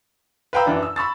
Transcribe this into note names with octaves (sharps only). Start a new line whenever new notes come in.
B4 F5 G5 A#5 B5 E6
F#2 E3 D4
E6
B5 C#6 E6 A6